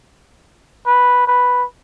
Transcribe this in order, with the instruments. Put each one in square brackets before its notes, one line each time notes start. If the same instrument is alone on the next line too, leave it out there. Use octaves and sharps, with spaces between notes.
[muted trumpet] B4
B4